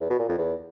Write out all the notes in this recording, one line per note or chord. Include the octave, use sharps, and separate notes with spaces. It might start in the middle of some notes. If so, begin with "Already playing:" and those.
E2
B2
A#2
F2
E2